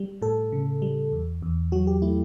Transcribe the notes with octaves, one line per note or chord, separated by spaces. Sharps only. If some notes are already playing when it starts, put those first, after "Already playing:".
Already playing: G3
A2 A4
C#3
G3
E2
E2
F#3 F#4
G4
A3 E4